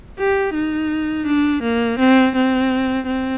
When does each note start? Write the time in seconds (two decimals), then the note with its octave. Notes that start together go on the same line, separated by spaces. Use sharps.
0.19 G4
0.55 D#4
1.27 D4
1.63 A#3
1.99 C4
2.36 C4
3.08 C4